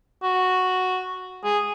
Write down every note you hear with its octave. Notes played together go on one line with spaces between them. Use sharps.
F#4
G#4